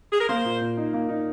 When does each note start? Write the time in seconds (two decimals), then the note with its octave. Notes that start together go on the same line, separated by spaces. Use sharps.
0.13 G#4
0.20 A#4
0.28 A#3 C5
0.44 A#2
0.61 A#2
0.77 D#4
0.93 A#3
1.09 D#4